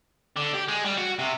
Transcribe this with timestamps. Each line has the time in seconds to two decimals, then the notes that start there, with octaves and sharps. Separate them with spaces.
0.36 D3
0.54 G4
0.68 G#3
0.85 G3
0.98 F#4
1.19 C3